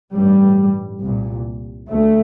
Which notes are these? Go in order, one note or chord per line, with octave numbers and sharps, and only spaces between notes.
A1 G2 G3
C2 A#2
D2 A3